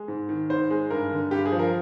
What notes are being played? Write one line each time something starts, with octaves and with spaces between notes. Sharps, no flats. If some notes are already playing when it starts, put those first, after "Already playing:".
Already playing: G#3
G#2
D#3
G#2 C5
G#3
G2 A#4
D3
G2 G4
G#4
F3
A#4